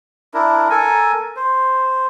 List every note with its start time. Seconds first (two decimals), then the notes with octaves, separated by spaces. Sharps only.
0.34 D4 E4 A#4
0.70 A4 A#4 G#5
1.36 C5